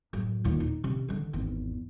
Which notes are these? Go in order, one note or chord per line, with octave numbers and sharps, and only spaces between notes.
F#2 A2
D#2 A#2
D#4
C3 D#3
D3 D#3
G#1 E2